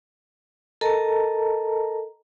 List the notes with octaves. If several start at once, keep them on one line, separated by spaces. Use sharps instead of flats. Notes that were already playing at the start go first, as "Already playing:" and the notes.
A4 A#4 D#5 A5 A#5